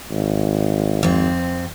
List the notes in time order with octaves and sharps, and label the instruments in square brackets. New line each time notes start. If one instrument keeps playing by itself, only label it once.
[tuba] G#1
[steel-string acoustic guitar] F2 C4